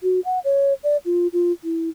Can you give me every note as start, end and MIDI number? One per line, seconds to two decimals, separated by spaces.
0.03 0.20 66
0.25 0.39 78
0.44 0.74 73
0.84 0.97 74
1.05 1.27 65
1.33 1.52 65
1.64 1.89 64